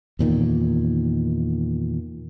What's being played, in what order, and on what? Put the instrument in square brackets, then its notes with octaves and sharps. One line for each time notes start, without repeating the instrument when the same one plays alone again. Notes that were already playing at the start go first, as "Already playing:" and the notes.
[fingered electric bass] E2 A#2 D#3